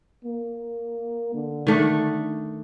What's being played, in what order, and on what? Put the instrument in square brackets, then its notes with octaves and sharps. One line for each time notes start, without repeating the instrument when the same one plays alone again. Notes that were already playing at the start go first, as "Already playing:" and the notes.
[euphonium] A#3
D3
[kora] D#3 A3 D4